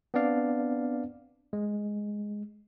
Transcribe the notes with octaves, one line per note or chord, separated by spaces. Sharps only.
B3 C4 D4 D5 F5
G#3